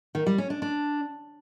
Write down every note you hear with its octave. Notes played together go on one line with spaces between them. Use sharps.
D#3
G3
C#4
D4
D4